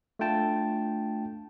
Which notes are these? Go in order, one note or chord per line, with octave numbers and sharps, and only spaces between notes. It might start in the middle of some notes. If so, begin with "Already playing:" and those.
A3 D4 F4 G5 A5